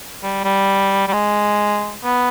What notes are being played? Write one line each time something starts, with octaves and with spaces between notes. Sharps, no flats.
G3
G3
G3
G#3
B3